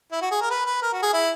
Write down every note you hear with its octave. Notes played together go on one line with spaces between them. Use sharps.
E4
F#4
G#4
A#4
B4
B4
A#4
F#4
G#4
E4